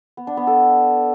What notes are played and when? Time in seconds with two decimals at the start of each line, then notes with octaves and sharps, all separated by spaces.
0.17 B3
0.27 D4
0.37 B3
0.47 A4